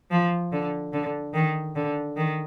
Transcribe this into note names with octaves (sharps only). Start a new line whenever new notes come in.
F3
D3
D3
D#3
D3
D#3